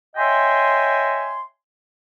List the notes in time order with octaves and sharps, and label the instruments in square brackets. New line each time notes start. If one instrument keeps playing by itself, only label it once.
[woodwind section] C#5 D#5 E5 G5 G#5 C6